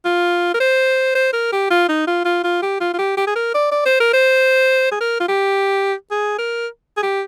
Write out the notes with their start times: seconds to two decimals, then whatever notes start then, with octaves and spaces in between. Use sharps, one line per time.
0.05 F4
0.54 A#4
0.60 C5
1.15 C5
1.33 A#4
1.52 G4
1.71 F4
1.89 D#4
2.07 F4
2.25 F4
2.44 F4
2.62 G4
2.81 F4
2.94 F4
2.99 G4
3.17 G4
3.27 G#4
3.36 A#4
3.54 D5
3.72 D5
3.86 C5
4.00 A#4
4.13 C5
4.91 G#4
5.00 A#4
5.20 F4
5.28 G4
6.11 G#4
6.38 A#4
6.97 G#4
7.03 G4